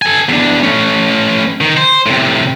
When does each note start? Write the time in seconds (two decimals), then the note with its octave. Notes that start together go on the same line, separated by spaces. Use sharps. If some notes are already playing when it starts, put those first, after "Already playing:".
0.02 A4 G#5
0.29 E2 D4
0.63 A3 C#4
1.61 D#3
1.77 C5
2.06 A2 C3